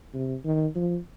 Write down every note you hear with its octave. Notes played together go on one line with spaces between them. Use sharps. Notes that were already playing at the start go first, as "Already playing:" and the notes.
C3
D#3
F3